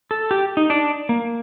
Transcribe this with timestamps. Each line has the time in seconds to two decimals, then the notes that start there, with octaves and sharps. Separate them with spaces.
0.11 A4
0.31 G4
0.57 D#4
0.70 D4
1.09 A#3